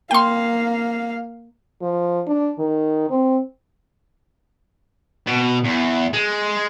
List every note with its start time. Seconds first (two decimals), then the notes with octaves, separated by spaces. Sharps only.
0.11 A#3 F5 G5 C6
1.82 F3
2.27 D4
2.59 D#3
3.10 C4
5.27 B2
5.64 E2
6.13 G#3